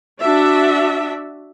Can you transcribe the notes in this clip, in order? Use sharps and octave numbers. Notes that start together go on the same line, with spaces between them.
D4 F#4 E5